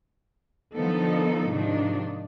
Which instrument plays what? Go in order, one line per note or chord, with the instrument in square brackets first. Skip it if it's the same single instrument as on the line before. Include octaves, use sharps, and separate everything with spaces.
[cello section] D3 D#3 F3 B3 D#4 A4
G#2 C3 D#3 F3 D4 D#4